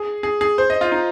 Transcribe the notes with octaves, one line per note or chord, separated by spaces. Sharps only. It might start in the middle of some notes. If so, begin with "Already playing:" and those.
Already playing: G#4
G#4
G#4
C5
D#5
F4
D#4